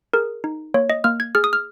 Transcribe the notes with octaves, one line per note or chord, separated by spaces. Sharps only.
G#4 A#4
D#4
A#3 C#5
D#5
A#3 F6
G#6
G#4 F6
D#6
F6